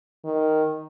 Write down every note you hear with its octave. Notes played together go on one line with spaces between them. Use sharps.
D#3